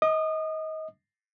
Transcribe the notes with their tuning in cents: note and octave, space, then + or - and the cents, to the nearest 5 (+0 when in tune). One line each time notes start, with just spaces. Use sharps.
D#5 +25 D#6 -35